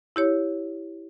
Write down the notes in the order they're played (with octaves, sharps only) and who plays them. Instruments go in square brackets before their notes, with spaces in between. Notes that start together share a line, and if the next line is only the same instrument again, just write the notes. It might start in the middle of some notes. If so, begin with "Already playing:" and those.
[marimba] E4 G4 C#5